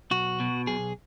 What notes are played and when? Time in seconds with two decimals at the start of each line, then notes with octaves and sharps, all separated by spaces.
0.11 B1 F#4
0.40 B2
0.67 B1 G#4